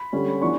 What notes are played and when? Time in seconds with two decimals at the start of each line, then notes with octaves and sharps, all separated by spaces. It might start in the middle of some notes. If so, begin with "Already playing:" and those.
Already playing: B5
0.13 D3 G3 C#4
0.41 E3 B3 D4 C#6